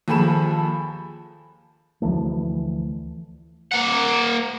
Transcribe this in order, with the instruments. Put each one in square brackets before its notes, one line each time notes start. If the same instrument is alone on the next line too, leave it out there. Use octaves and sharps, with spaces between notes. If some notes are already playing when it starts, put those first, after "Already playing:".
[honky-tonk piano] D#2 F3 G#4 A4 B5 E7
[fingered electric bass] D2 E3 F3 A3
[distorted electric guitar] A#3 F#5